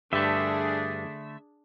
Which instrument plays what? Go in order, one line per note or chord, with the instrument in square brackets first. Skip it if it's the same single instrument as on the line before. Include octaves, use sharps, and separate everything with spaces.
[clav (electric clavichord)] G2 [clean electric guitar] D3 A3 [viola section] D4 G#4 [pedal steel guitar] E5